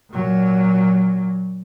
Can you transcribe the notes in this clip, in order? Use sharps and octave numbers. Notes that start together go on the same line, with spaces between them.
A#2 F#3